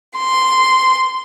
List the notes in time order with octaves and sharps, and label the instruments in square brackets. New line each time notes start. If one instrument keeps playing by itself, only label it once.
[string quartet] C6